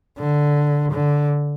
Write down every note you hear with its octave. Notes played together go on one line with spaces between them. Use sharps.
D3
D3